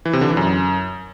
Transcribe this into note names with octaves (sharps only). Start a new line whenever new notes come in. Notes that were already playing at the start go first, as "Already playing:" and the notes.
E3
C3
D3
E3
F#2